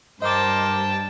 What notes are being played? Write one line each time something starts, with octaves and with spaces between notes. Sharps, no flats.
G2 A#4 C5 D#5 G5 A5 D6